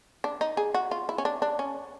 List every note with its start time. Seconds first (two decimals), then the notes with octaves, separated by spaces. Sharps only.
0.24 D4
0.41 D#4
0.57 G#4
0.74 F#4
0.91 F4
1.09 E4
1.18 C#4
1.25 D4
1.42 D4
1.59 C#4